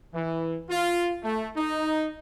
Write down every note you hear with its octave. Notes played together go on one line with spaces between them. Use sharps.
E3
F4
A3
D#4